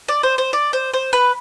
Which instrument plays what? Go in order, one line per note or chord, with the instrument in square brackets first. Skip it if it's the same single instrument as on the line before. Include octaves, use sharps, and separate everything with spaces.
[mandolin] D5
C5
C5
D5
C5
C5
B4